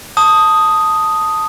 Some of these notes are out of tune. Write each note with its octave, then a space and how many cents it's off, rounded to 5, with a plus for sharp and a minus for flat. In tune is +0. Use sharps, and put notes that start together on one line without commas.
A5 +10 D#6 +0